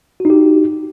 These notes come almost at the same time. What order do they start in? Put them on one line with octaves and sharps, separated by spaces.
F#4 D#4 G4